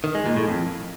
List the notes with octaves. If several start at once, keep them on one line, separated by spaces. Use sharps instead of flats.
D#3
G#3
A#2
A2
F2